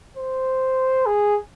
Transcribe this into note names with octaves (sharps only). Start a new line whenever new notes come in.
C5
G#4